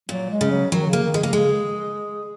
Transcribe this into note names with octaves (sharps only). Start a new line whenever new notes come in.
A#2 F#3
G#3
C#3
F#3
D#3 F#3
C#3
A#3
D#3
G#3
C#3 A#3
C#3 G#3